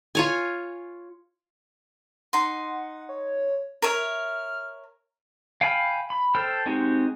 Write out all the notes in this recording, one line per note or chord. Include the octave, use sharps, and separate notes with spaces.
F4 C#5 G#5
D#4 F#5 C6
C#5
A#4 C#5 E5 F6
F5 G5 G#5 B5 F6
B5
A4 C5 G5 F6
G#3 C4 D#4 F#4 G4